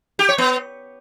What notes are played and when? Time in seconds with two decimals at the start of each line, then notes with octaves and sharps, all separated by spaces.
0.19 G4
0.29 C#5
0.38 B3